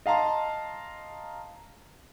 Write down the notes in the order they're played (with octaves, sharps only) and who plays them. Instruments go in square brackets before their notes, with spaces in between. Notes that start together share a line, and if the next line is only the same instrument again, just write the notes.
[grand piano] D#5 F5 A5 A#5 C6